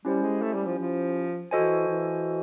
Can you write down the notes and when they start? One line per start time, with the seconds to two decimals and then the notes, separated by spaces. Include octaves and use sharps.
0.05 G3 C#4 E4 G4 C5
0.22 G#3
0.42 A3
0.54 G3
0.66 F3
0.79 F3
1.51 E3 F#4 A4 C5 D#5 G#5
1.88 E3